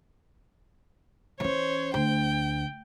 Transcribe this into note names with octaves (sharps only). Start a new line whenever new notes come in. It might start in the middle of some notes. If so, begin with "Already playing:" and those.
E3 C#4 C5 C#5
D2 G5